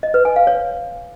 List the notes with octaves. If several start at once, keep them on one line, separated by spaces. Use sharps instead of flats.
D#5
B4
G#5
F5
C#5